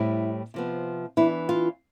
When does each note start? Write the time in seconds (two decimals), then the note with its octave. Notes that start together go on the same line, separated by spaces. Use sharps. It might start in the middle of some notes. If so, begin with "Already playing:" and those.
Already playing: A2 G3 C4 E4
0.54 C3 F3 B3
1.17 E3 B3 D4 E4
1.49 F4